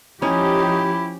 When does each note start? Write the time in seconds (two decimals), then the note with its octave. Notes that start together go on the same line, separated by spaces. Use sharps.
0.22 F3 C#4 D#4 E4 G4